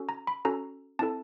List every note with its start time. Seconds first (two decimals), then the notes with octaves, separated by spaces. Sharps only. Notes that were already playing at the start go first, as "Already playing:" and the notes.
Already playing: C#4 F#4 A4
0.09 A#5
0.27 B5
0.45 C#4 F#4 A4 A#5
0.99 C4 E4 A4 A5